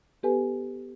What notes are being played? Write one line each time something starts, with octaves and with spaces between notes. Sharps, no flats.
B3 G4 A4 B4 G#5